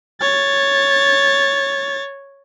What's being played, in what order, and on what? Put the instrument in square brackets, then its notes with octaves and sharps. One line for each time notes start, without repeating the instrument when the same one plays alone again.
[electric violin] C#5 A6